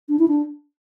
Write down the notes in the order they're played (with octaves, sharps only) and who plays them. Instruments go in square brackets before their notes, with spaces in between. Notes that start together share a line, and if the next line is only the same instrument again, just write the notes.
[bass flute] D4
E4
D4